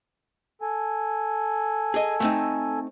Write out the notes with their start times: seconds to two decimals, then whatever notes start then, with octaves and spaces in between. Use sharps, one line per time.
0.62 A4 G#5
1.94 G#4 D#5
2.20 A3 C4 D#4